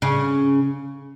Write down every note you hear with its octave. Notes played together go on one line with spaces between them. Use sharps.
C#3